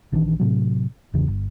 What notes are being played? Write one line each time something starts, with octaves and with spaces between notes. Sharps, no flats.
A#1 D#3 E3 D4
A2 C3 F#3
G#1 E2 C#3
G1